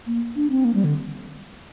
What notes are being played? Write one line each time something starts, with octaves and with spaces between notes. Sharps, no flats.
A#3
D4
C4
A#3
G3
D3